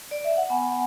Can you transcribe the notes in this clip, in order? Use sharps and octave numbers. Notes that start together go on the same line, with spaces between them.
D5
E5
F#5
B3 G#5
F#5